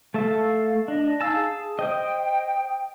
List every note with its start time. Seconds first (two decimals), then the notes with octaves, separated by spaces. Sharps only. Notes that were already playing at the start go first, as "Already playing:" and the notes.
0.14 A3 A4 E5 F5
0.88 D4 D#5
1.21 D#4 F5 G#5 A5 E6
1.36 G#4
1.79 C5 D#5 G5